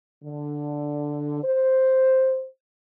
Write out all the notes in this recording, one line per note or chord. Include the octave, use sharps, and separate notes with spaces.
D3
C5